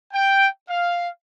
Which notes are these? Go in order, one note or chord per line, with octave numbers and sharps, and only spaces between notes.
G5
F5